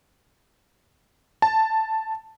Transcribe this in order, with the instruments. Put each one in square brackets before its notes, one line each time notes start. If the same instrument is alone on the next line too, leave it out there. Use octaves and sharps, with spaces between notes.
[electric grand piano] A5